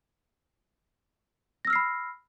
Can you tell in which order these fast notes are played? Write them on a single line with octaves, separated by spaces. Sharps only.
A#6 E6 F6 C7 B5